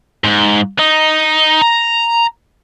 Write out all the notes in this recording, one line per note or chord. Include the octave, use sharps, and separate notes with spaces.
G#2
D#4
A#5